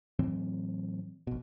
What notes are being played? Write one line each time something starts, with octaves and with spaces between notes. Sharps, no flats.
A2 E3 F#3 C4
A#1 B2